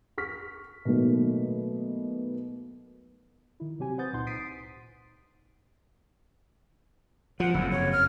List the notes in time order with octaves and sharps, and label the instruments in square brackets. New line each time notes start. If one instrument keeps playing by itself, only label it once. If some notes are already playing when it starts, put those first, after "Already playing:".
[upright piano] C#6 F6 B6
B2 D#3 F#3 A3 A#3
[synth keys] D#3 E4
C3 F#3 C4 G4 G#5
B4 C5 F#5 D#6 G6 A6
C#2 A#2 D#4 F#5 C6
D#6 A6 B6 C7 D7 D#7
[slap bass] F3 [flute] F#5
[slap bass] F#1 F2
[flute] C#5
F6